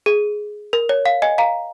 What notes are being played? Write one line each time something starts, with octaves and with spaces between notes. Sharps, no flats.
G#4
A#4
C#5
F5
D#5 G#5
F5 A#5